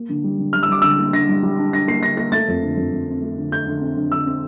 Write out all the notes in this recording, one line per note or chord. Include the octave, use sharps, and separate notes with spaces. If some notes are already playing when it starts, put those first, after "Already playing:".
Already playing: A#3
D3
G3
D3
G3 F6
E6
G3 D6
D3 E6
A#3
D3 A#6
G3
G3
D4
D4 A#6
A#3 C7
D3 A#6
A#3 A#6
A3 A6
F2
D3
F2
F2
C4
A3
D3
A3 G6
D3
C4
D3
D3 E6
C4